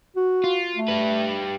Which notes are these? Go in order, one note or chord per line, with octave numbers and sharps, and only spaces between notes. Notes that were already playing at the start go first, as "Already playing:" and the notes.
F#4
F4
A3
G3 B4